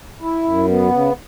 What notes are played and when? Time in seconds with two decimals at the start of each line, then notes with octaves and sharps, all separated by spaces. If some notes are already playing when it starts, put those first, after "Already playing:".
0.20 E4
0.44 F#2
0.67 B3
0.91 C#3